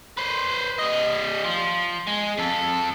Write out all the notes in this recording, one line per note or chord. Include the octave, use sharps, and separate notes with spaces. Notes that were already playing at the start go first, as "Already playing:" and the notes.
B4 C5
G3 D#5
F3
G#3
F2 A4